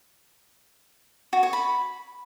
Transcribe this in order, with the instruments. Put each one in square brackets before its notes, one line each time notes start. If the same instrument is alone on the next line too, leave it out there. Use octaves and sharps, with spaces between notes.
[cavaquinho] F#4
C#5
B5